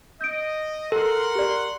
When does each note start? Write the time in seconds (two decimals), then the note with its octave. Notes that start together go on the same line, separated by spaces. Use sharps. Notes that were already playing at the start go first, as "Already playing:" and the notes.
0.21 D#5 G6 D7
0.92 A4 A#4 F#5 C6
1.35 G4 D5